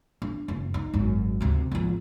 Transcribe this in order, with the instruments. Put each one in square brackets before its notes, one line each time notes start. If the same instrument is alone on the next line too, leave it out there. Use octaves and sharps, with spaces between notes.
[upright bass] D4
F#1
D#4
G#1 F#2
D2 C3
G#1 F3